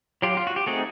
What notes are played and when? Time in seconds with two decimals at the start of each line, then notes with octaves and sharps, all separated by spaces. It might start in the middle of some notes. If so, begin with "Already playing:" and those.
0.22 F#3 F4 G4
0.37 F4
0.47 F#4
0.56 G4
0.66 A3 C4 D#4 F#4 G#4